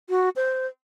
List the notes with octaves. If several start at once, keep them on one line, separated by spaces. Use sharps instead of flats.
F#4
C5